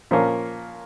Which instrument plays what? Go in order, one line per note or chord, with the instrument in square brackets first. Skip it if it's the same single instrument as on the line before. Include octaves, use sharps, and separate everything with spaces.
[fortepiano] A#2 F3 A#3 C#4